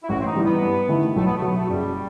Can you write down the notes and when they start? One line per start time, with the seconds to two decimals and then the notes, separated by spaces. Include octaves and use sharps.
0.04 E4
0.09 A1 F#4
0.20 C4
0.27 D#4
0.35 G2 E3 G3
0.44 B3
0.62 G2
0.89 D#3 A3 E4
1.16 B1 A3
1.26 B3
1.36 A3
1.42 B2 F#3 B3
1.56 A3
1.69 F#1 G3